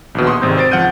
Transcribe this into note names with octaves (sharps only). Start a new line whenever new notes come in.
A#1 D#2 B2
C6 C#6 D#6
G#1 G#2 C3 C4 G6
C5 A6 D7
C#2 F3 F#5 F6 G6 D#7